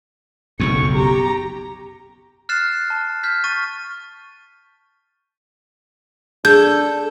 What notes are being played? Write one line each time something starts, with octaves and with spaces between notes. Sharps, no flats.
F#1 B1 F2 C#6
G4 A#5
F6 F#6 A6 C7 E7
A5
F6 G6 B6
C#6 A6 D#7
D4 G#4 A4 G6